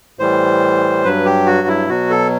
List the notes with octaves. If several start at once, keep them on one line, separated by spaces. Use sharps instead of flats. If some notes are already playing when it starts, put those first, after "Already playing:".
A2 E3 G3 C5
G2 F#3 B4
G4
F#4
E4
B2 F#3 F#4
A4